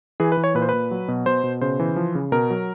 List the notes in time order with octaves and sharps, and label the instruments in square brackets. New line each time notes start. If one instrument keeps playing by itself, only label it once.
[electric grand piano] E3 G#4
B4
E3
C#5
A#2 B4
C5
A#2 B4
F#3
B2
B2 C5
B2
C#3 C5
E3
F3
C#3
B2 A#4
F#3